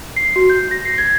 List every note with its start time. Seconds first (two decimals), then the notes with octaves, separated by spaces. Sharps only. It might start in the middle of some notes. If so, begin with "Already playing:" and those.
0.16 C7
0.36 F#4
0.50 G6
0.71 A#6
0.85 C7
0.98 G#6